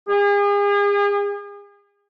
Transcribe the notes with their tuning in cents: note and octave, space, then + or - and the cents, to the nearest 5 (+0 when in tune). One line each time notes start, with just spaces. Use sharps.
G#4 -40